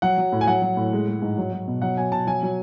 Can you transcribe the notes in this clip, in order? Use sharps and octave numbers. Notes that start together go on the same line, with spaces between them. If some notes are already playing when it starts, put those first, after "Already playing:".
F#3 F#5
F#3
A2
G#5
F#3 F#5
F#3
A2
G#3
G#3
G#2
F#3
F#3
B2
F#3 F#5
F#3 G#5
B2 A5
F#3 G#5
F#3